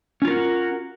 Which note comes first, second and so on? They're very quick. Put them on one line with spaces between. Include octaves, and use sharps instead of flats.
C#4 F4 A#4 F#4